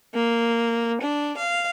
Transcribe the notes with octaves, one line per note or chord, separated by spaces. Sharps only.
A#3
D4
F5